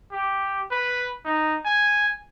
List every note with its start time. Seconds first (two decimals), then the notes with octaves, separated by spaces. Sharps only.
0.12 G4
0.71 B4
1.25 D#4
1.65 G#5